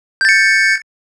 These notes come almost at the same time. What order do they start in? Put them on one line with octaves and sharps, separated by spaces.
G6 A6 C#7